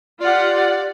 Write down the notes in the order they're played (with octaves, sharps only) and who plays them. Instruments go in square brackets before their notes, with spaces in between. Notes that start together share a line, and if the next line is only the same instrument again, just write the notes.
[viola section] F4 G4 F#5 [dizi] D5